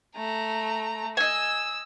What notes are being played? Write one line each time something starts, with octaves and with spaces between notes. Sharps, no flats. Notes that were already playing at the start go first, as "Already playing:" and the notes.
A3 A#5
D#5 G#5 E6